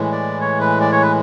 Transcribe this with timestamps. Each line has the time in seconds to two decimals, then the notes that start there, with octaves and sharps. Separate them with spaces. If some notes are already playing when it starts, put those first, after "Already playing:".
Already playing: A2 E3 G#3
0.12 D5
0.41 C#5
0.60 B4
0.81 D5
0.92 C#5
1.02 B4